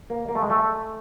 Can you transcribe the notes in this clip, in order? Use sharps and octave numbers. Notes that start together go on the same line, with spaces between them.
A#3
A#3
A3
G#3
A3